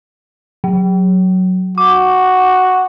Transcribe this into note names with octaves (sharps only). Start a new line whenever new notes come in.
F#3
F#4 D6